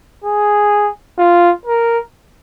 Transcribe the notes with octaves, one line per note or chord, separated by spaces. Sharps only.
G#4
F4
A#4